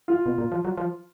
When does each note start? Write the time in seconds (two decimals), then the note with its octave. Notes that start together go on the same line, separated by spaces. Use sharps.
0.08 F4
0.26 B2
0.38 A#2
0.52 F3
0.65 F#3
0.78 F3